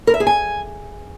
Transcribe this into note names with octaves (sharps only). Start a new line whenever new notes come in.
A#4
E5
G#4
G#5